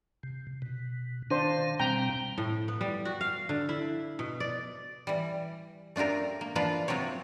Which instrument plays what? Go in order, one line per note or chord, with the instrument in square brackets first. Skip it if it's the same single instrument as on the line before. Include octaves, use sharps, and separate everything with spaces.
[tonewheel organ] C3
B2
[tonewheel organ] D#3 F5 [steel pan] D4 C5
[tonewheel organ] B2 G3 C4 [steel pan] G5 A#5
[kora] A2
B3
G3
F#4
F5
D3
E4
B2
D5
[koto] E3 G3
A3 D4 F4 G4 A#4
A#3
E3 F3 A#3 D4 F4 B4
C3 F#3 F4 G4 C#5